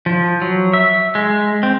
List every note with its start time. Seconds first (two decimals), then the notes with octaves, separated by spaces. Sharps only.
0.06 F3
0.42 F#3
0.73 E5
1.15 G#3
1.63 C4